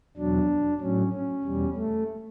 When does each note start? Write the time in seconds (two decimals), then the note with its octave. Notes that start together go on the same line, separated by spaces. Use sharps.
0.17 E2 B2 F#3 D4
0.80 A2 F#3 C#4
1.12 C#4
1.44 E2 B2 G3
1.76 A3